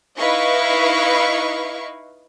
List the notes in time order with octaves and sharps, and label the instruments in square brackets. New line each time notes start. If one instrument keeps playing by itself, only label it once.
[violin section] D#4 E4 B4 D#5 F5 C#6